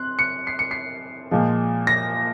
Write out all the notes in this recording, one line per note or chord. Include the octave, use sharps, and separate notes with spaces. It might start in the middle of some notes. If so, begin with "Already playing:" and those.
Already playing: C4 C6 F#6
C#7
C7
C#7
C7
A#2 F3 G#3
A#6